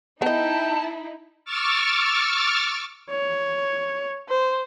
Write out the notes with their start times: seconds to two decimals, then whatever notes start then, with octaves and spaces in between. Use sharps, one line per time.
0.22 B3 D#4 E4 D#5 G5 A5
1.45 C#6 D6 E6 F6 A6
3.10 C#5
4.29 C5